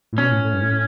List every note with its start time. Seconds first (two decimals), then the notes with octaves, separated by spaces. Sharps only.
0.13 A2
0.18 B2 C#4
0.31 A2
0.44 A2
0.53 G2
0.62 A2